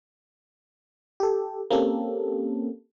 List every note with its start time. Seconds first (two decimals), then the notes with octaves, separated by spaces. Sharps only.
1.20 G4 A4
1.71 A#3 C4 C#4 G4 A4